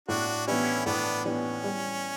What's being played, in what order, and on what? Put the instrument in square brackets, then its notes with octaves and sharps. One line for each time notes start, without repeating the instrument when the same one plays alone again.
[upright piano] A2 [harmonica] D4 F#4
[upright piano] E3 B3 D4 G4 [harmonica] C#4 E4
[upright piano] A2 [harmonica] B3 D4
[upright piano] E3 B3 D4 G4 [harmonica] C#4
[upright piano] G3